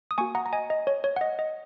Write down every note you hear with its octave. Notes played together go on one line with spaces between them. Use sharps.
D#6
A#3 F#4 G#5 C#6
F#5 A#5
A#5
D#5 G#5
D#5
C#5
C#5
F#5
D#5
D#5